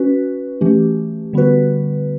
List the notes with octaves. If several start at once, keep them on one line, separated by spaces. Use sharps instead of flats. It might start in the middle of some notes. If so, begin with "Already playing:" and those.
Already playing: C#4 F#4 B4
E3 A3 C#4 G4
D3 G3 B3 F#4 B4